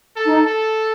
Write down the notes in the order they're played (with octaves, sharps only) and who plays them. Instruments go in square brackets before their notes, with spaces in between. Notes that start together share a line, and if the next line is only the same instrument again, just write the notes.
[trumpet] A4
[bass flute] D#4
[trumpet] A4